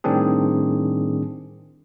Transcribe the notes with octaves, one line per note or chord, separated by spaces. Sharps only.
A2 D#3 G3 C4 D4 G#4